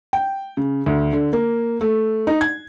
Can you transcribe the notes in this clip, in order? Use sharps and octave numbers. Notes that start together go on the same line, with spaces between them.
G5
C#3
D2
D3
A#3
A3
D#4
G#6